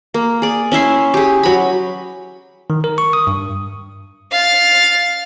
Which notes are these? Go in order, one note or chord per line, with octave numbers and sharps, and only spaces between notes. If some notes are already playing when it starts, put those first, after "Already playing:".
A#3
G#4 D5
C#4 E4 E5 C6
G4 G#4
F#3 B5
D#3
A#4
C#6
D#6
G2
F5 A6